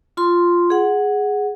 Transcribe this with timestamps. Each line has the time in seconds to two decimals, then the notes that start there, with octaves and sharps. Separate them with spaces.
0.17 F4 C6
0.70 G#4 F#5